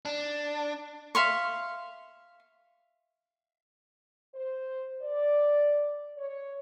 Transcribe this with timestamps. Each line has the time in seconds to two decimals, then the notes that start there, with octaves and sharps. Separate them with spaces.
0.05 D4
1.15 E5 F5 C6 C#6
4.34 C5
5.02 D5
6.17 C#5